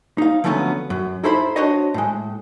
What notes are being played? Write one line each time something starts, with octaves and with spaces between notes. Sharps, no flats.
D#4 F5
D3 F3 F#3 A3 B3 C#4
F#2
D#4 E4 A4 C5 E5 B5
D4 F#4 C5 C#5 D#5
A2 G#3